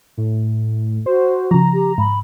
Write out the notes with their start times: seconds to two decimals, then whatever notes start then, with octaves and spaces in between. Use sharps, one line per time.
0.17 A2
1.06 F#4 C5
1.51 C#3 F3 A#5
1.73 G4
1.98 G#2 B5